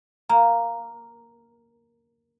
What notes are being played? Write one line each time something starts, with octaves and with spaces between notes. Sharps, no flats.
A#3 A#5